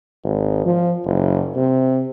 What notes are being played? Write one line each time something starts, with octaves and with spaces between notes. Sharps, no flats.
G#1
F3
F#1
C3